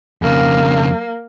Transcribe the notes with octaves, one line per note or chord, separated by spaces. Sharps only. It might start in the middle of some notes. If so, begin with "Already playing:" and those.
F2 C#3 A#3